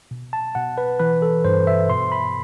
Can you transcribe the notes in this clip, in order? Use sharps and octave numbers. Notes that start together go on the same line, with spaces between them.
B2
A5
B2 F#5
B4
E3 B4
A4
G2 C5
E5
B2 C6
B5